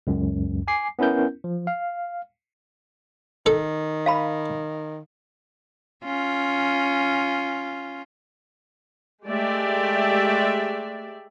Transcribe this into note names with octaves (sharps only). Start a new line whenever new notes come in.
C#2 F#2
G#5 D6 C7
B3 C#4 E4 A#4 G6
F3
F5
D#3 A4
F5 A5 B5
C#4 F4
G#3 A3 G4 D5 E5